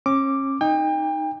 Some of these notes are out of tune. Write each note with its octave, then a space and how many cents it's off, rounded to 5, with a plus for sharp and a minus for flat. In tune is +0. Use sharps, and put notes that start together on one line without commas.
C#4 -35 D6 +0
D#4 +0 G5 +35